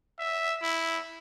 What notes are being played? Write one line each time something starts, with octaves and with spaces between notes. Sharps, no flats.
E5
E4